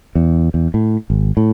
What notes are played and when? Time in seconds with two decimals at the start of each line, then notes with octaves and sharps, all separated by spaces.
0.15 E2
0.54 E2
0.74 A2
1.10 G#1
1.37 A2